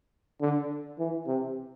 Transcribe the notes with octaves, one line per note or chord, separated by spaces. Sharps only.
D3
E3
C3